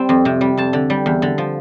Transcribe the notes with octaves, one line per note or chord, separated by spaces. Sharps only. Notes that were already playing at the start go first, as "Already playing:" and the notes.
Already playing: G3 C4
F2
C3
G3
F2 A5
D3
G3
E2
D3
F3